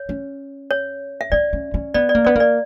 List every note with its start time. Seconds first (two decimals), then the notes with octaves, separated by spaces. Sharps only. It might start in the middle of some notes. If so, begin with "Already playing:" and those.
Already playing: C#5
0.09 C#4
0.71 C#5
1.21 E5
1.32 C#4 D5
1.53 C#4
1.74 C#4
1.94 B3 D5
2.09 D5
2.15 A#3
2.25 B3 D5
2.36 A#3 D5